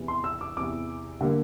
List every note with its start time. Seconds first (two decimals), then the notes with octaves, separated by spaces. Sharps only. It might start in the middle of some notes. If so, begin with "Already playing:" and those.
Already playing: E2 C3 E3
0.08 C6
0.24 E6
0.41 D6
0.57 E2 C3 E3 D6
1.21 D3 G3 A#3